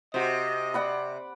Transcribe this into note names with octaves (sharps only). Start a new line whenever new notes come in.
C3 F#4 C5 D#5
D5 F#5 B5